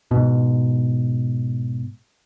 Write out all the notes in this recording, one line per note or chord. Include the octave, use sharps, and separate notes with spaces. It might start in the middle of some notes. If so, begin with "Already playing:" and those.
G#2 B2